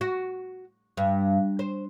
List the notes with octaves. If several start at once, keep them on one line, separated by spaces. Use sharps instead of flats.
F#4
G2
C5